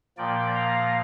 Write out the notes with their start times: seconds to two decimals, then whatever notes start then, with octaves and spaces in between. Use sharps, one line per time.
0.17 A#2 F3 A#3 D5 G5
0.55 F5 A#5